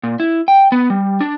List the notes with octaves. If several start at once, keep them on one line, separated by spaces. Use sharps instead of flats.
A#2
E4
G5
B3
G3
D4